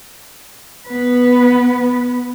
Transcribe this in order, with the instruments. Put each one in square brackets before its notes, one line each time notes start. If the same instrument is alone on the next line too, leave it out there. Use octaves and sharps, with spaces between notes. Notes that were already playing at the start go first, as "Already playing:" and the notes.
[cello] B3 B4